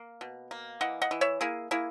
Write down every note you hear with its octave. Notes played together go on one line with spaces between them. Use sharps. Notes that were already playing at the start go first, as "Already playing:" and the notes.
Already playing: A#3
B2
A#3
E3 D#5 F#5
D#5 F#5
E3
C#5 E5
A#3 E4 G#4
A#3 E4 G#4